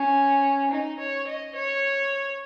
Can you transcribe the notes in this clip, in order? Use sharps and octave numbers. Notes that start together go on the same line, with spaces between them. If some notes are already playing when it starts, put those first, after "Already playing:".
Already playing: C#4
D#4
C#5
D#5
C#5